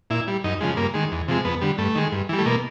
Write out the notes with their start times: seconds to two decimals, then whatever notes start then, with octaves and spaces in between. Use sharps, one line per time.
0.10 A#2 E4
0.27 G3
0.44 F#2 D#4
0.61 C#3 F3 G#3
0.77 G2 A#3
0.94 D#3 G#3
1.12 E2
1.28 C3 F3 G#3
1.45 F2 B3
1.61 D3 G3
1.78 G2 A3
1.95 D#3 G#3
2.12 G2
2.29 E3 G3
2.38 A3
2.46 B2 A#3